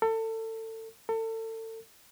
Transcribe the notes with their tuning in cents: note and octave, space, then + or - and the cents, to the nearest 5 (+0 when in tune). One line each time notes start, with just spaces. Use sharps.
A4 +30
A4 +35